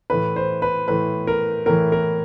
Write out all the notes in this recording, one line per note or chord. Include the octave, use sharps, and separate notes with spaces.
A2 E3 B4
C5
B4
A2 E3 B4
A#4
A2 E3 A#4
A#4